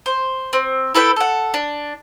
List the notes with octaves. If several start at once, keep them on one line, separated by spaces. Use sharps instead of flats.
C5
C4
E4 A4 B4 G5
A4 F#5
D4